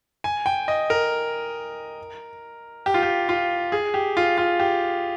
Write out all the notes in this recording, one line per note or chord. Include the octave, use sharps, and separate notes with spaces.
G#5
G5
D#5
A#4
G4
F4
G4
F4
G#4
G4
F4
F4
G4